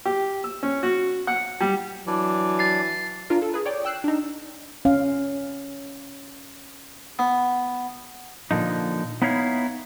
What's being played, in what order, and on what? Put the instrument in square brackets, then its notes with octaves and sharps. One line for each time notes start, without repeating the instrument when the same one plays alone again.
[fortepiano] G4
E6
C#4
F#4
F#5
G3
[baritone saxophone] E3 [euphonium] F#3 [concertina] D4 D5
[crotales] A6 C7
[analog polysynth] D4 F4 A#4
A4
G#4 B4
C#5 D5 G5 D6
G5 E6 F#6 C7
D4 D#4
[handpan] C#4 F5
[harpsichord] B3
[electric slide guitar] A#2 D3 F3 D#4
B3 D#4 E4 C#5 F5